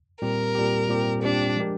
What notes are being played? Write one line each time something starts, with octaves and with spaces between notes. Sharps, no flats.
A#2 G3 C4 G4 A#4
A#2 G3 C4 G4
A#2 G3 C4 G4
A#2 G3 C4 D4 G4
F3 G#3 D4 G4 A#4